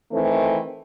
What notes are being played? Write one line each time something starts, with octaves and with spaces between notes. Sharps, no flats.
D#3 E3 A3 C4